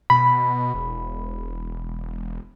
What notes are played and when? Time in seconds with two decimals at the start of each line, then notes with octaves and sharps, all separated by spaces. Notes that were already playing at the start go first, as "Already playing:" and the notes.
0.10 B2 B5
0.74 E1